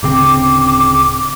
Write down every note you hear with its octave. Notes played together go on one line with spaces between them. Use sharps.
D1 C#3 C4 D6